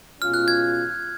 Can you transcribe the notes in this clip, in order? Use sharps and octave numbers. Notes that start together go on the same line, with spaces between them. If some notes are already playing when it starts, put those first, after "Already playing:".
B2 G#3 C#4 F4 F6
F#6
G#6